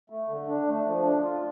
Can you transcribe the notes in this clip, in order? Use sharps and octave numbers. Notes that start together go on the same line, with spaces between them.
A3
D3
D4
A3
F3
D4
F4